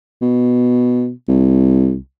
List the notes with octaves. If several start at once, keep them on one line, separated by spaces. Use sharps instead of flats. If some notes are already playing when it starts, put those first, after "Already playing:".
B2
C2